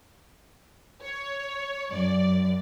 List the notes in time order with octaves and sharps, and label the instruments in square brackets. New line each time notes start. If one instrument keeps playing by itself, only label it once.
[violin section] C#5
[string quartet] F#2 [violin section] D5